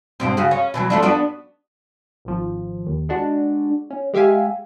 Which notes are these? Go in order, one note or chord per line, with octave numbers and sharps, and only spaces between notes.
G2 B2 C4
C#3 F#4 G#4
C#4
B2 E3 F#3
F3 A3 D4
B3 D4 F#4
G#1 F3
D#2
G#3 D4 F#4
C#4
G#3 G4 E5 F5 G#5